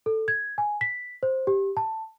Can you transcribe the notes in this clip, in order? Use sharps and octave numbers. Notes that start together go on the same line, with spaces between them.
A4
G#6
G#5
B6
C5
G4
A5